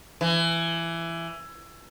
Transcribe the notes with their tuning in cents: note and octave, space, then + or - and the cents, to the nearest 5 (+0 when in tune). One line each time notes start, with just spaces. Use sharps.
E3 +20